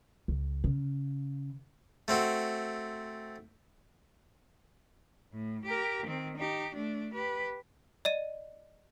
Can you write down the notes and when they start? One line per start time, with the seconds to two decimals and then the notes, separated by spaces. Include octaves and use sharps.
0.28 C#2
0.64 C#3
2.08 A3 C4 F#4
5.33 A2
5.65 G4 A#4
6.07 D#3 C4
6.37 D#4 G4
6.74 A3 D4
7.14 G4 B4
8.05 D5 D#5 D#7